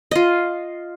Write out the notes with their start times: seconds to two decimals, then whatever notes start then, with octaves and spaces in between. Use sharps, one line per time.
0.11 F4 D#5